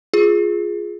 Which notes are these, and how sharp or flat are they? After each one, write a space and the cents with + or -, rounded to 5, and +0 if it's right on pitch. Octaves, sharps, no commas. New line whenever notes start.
F4 +0 G#4 +0